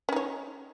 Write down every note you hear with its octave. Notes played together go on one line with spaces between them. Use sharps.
C#4 D#4 C#5